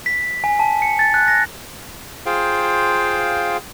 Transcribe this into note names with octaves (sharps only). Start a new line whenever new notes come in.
B6
G#5
A5
C#7
A6
F#6
A#6
F4 G#4 C5 F5 G5